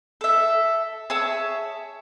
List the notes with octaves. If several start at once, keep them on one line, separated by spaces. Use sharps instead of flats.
A4 E5
G#4 C#5 E5 A5